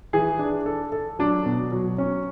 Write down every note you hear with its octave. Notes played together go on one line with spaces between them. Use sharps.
E3 G#4
D4
A4
A4
F#3 D4
B2
F#3
C#4